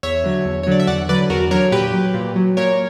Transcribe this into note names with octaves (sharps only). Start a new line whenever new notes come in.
E2 C#5 E5
D3 F#3
E2
C#5
D3 F#3 D5
E5
E2 D5 F#5
D3 F#3 B4 D5
E2 F#4 A#4
D3 F#3 A#4 C#5
A#2 G4 B4
F#3
A#2
F#3
A#2 A#4 C#5